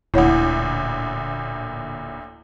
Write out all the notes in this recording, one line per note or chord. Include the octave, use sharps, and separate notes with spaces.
D1 A1 D2 A#2 E4 C#5 F#5